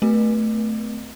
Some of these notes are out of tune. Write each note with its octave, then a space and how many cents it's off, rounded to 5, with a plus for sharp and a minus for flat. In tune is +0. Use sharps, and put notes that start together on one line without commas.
A3 +0 C4 -45 B4 -40